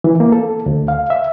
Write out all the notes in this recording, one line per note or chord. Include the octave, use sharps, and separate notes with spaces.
E3
A#3
A4
D2
F5
E5